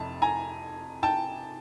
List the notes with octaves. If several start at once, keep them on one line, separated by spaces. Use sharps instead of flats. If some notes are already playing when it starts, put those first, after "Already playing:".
Already playing: F1 F2 C3 A5
G#5 A#5
G5 A5